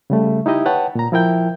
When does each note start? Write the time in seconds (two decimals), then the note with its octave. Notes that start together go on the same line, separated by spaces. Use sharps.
0.10 C#3 G3 A3
0.46 D#4 E4 G4 D#5
0.66 B4 C#5 F#5 G5 A5
0.95 A#2 A#5
1.12 F3 E4 A#4 G5 G6